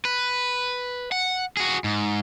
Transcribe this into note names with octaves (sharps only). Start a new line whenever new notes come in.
B4
F#5
F#4 G#4
G#2